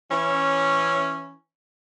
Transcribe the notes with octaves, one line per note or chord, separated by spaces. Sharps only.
E3 C#4